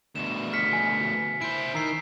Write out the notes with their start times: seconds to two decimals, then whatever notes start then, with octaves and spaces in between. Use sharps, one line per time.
0.16 D2 B2 E7
0.53 F6 B6 C#7
0.73 G#5
1.42 E4 C5 D7
1.75 D#3 A#5 E6 C7